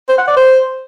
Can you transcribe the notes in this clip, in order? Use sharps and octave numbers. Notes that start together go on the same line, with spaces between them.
C5
F#5
D5
C5